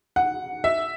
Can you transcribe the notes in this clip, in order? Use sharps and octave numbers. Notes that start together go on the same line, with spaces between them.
F#5
E5